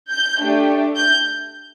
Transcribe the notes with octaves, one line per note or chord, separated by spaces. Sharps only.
G6
A3 D4 G4
G6